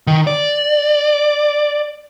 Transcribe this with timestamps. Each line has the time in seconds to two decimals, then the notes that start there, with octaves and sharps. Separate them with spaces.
0.07 D#3
0.27 D5